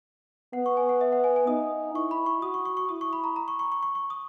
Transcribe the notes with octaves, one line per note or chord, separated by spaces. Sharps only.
B3 F#5
C#6
G#5
F#5
E5
F#5
G#5
G#5
D#4 D#6
E4 C#6
B5
C#6
F#4 D#6
C#6
C#6
C#6
E4 D#6
C#6
B5
A#5
A#5
C#6
C#6
C#6
C#6
C#6
D#6